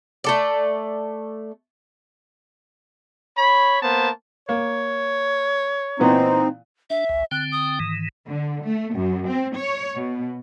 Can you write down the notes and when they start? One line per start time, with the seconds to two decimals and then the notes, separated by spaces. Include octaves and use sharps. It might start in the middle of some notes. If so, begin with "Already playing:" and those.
0.24 A3 A4 D5
3.38 C#5 B5
3.82 A#3 B3 C5 A5
4.49 A#3 C#5
6.00 A#2 E3 B3 C4 D#4
6.90 D4 E5
7.09 G#1 C#2
7.31 D3 C4 G5 F#6
7.52 D#6
7.80 G#2 D#3 E3
8.28 D3
8.65 A3
8.96 F#2
9.27 C4
9.57 C#5
9.98 B2